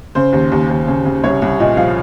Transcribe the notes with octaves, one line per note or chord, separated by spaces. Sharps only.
C#3 C5
D#2
D#2
D#2
C#3
C#3
C2 C#5
C2
A#2 D#5
F3 F5